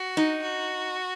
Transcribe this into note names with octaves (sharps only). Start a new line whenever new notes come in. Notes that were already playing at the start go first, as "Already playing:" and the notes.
Already playing: F#4
D#4
F#4